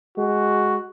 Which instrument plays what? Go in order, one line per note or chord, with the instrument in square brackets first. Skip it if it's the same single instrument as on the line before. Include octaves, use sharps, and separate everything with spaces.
[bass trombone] G#3 [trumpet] F#4